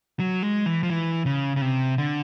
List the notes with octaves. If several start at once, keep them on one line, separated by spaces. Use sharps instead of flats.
F#3
G#3
E3
F3
E3
C#3
C#3
C3
D3